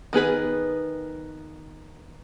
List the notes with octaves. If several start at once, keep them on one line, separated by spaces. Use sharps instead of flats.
D#3 B3 G#4 B4